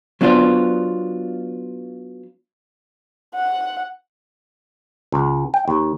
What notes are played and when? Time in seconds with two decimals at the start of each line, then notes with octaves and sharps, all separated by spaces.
0.21 F#3 B3 D4 F4 C5
3.35 F#5
5.12 C#2
5.54 G5
5.68 D#2